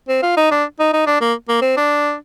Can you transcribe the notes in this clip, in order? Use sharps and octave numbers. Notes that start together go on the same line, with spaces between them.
C4
F4
D#4
D4
D#4
D#4
D4
A#3
A#3
C4
D4